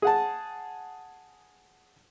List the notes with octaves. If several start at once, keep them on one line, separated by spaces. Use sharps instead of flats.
G#4 F#5 A5